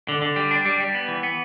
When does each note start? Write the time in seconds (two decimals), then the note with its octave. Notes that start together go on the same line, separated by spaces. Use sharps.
0.08 D3
0.22 D3
0.36 G3
0.51 D4
0.65 G3
0.80 G3
0.95 B3
1.08 E3
1.23 B3